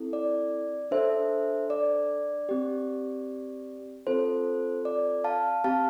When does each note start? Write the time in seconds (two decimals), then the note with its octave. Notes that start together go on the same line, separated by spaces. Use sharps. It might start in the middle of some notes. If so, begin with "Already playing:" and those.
Already playing: C4 E4 A4
0.13 D5
0.91 D4 A4 C5 E5
1.70 D5
2.49 C4 G4
4.07 C4 F4 A4 C5
4.85 D5
5.24 F5 A5
5.64 C4 G4 F5 A5